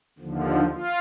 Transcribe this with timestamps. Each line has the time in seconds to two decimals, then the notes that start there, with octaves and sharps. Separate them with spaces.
0.18 D#2 D3 F3
0.71 F4